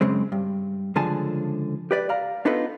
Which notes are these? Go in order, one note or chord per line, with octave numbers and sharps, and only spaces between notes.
F#2 C#3 G#3 C4
G2
C#2 D3 F3 G#4 G#5 A5
G4 B4 D5
D5 F5 A#5
B3 D4 D#4 F4 A4 B4